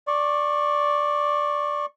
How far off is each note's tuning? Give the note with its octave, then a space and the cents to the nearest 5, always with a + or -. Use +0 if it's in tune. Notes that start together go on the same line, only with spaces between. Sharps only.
D5 +0 C#6 -20